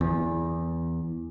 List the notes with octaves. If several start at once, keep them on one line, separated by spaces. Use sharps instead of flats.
E2